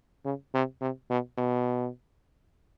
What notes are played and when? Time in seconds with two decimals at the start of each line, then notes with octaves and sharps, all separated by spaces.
0.25 C#3
0.54 C3
0.81 C3
1.10 B2
1.38 B2